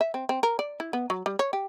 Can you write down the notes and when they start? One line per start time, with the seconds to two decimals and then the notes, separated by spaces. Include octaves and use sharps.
0.01 E5
0.14 C4
0.29 C4
0.43 A#4
0.59 D5
0.80 E4
0.93 B3
1.10 F#3
1.26 G3
1.39 C#5
1.53 G4